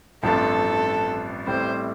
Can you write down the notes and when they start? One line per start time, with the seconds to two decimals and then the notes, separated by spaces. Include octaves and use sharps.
0.23 A1 G2 F3 C4 A4
1.47 A1 A2 G3 C4 E4 C5